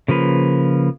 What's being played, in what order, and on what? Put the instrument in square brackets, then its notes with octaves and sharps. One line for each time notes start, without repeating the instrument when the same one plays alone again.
[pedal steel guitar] C#3 F3 A#3 B4